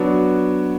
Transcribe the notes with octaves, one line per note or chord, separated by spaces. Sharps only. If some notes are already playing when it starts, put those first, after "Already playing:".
Already playing: F#3 B3 D4 F#4